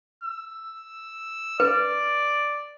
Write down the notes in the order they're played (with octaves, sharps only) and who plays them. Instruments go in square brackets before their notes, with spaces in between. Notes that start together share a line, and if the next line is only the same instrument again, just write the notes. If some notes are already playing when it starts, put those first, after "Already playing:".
[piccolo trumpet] E6
[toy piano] B4 [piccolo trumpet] D5